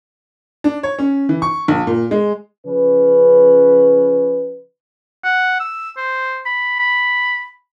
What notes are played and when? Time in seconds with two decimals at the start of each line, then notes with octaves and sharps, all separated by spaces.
0.64 D4
0.83 C#5
0.99 C#4
1.29 E3
1.42 C#6
1.68 A#1
1.87 A#2
2.11 G#3
2.66 C#3 F3 C#4 B4
5.24 F#5
5.60 E6
5.97 C5
6.46 B5
6.79 B5